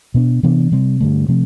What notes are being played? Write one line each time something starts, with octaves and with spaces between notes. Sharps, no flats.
B2 B3 D4
C3 E3 B3 D4
C3 G3 C4
G2 D3 A3
C3 F3 A3 C4